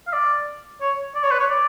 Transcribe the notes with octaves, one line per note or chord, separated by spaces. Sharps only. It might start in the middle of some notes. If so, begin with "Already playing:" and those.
F5
D5
C#5
D5
C#5
B4
C#5
D5